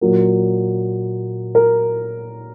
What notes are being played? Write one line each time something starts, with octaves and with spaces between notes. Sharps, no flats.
A#2 F#3 A#3
A#4